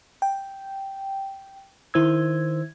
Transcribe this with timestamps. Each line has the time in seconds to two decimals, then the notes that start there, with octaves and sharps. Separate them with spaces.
0.22 G5
1.94 D#3 E4 C5 E6 G#6